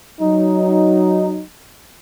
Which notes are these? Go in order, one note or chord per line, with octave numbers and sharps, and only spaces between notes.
F#3 D#4